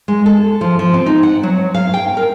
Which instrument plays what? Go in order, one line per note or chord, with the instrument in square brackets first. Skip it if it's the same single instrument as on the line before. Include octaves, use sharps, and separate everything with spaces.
[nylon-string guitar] G#3
A4
F3
F3
C4
D#4
F#5
F#3
F5
G5
A#4